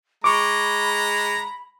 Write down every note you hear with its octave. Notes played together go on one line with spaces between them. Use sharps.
G#3 A#5 B5 C#6 D6